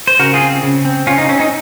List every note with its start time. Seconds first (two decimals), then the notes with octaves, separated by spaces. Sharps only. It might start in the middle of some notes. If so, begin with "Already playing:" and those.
0.07 C5
0.19 C#3 F#4 A#4
0.34 F4 G#4
0.41 C4
0.63 C#3
0.85 C4
1.07 C#3 C#4 F4
1.18 D#4
1.29 C4 C#4
1.40 D#4